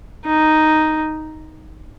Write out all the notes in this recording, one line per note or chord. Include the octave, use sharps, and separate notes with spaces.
D#4